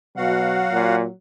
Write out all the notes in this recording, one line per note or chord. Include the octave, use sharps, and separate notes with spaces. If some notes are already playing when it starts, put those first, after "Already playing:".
B2 F#3 F#4 F5 F#5
A#2